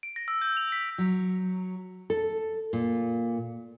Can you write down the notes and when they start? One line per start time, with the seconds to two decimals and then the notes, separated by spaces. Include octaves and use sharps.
0.03 D7
0.16 A#6
0.28 E6
0.42 G6
0.57 F7
0.72 B6
0.98 F#3
2.10 A4
2.73 A#2